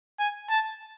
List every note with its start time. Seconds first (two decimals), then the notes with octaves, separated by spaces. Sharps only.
0.19 G#5
0.50 A5